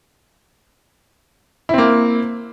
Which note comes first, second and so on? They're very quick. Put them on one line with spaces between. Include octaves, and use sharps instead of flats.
E4 C4 A#3